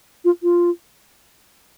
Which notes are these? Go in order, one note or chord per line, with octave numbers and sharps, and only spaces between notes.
F4
F4